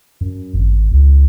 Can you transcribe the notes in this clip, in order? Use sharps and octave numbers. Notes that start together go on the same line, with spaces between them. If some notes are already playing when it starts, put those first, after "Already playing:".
F#2
G#1
C#2